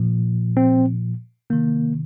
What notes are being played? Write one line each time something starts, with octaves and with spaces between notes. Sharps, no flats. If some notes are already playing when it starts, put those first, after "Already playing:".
Already playing: A#2 F3
C4
C3 D#3 A#3